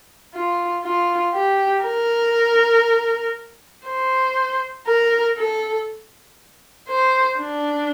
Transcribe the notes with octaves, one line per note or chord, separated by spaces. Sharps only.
F4
F4
G4
A#4
C5
A#4
A4
C5
D4